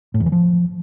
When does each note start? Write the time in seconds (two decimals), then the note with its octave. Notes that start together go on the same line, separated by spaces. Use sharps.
0.14 A2
0.20 E2
0.26 E3
0.32 F3